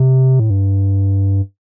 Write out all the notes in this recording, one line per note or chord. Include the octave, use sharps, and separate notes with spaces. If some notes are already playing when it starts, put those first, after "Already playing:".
Already playing: C3
A2
G2